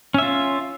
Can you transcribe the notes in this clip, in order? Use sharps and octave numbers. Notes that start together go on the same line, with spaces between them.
C#4 F4 E5